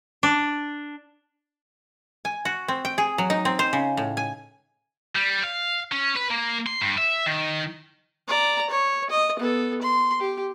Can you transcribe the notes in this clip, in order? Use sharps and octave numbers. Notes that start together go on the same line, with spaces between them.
D4
G#5
F#4
C4
G5
G#4
F#3
D#4
C4
C5
C#3
A2
G#5
G3
F5
C#4
B4
A#3
C6
G2
E5
D#3
D5 A#5
C#5
D#5
B3 A4
C6
G4